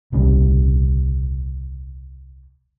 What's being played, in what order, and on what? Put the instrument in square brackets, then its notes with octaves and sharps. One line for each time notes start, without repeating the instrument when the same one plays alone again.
[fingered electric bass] D#1 C2 C#3 G3